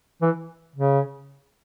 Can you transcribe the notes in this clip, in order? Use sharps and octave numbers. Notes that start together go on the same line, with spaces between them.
E3
C#3